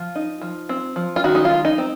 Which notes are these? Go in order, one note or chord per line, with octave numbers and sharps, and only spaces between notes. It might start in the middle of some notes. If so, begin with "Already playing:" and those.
Already playing: F3 F4
D#4
F3
C4
F3
F4
D#3 F#4
D#4
F4
G#3
D#4
C4